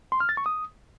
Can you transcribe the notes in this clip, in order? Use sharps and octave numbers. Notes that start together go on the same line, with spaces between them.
C6
F6
A6
C#6
D#6